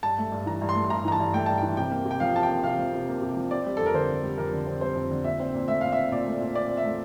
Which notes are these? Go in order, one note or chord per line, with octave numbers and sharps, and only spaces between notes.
G2 A5
A3
G2
E3 A#5
G2
C6
A3
C6
G2 A#5
E3 A#5
A5
G2
A3 G5
G2 A5
E3 G5
C3 G5
A#3
C3
G5
F3 F5
C3 A5
G5
A#3
C3 F5
F3
C3
A#3
C3
F3
C4 D5
G3
F2 A4
A#4
D3 C5
C4
G3
F2 A#4
D3
C4
G3 C5
F2
D3
A#2 E5
C4
A#2
A3 E5
A#2 F5
C4 E5
A#2 D5
A3
A#2
C4 D5
A#2
E5
A3